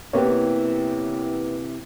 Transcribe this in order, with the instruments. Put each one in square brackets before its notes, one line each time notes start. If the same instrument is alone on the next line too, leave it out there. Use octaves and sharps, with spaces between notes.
[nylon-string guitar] C3 E3 [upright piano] A#3 B3 G4 [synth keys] C#5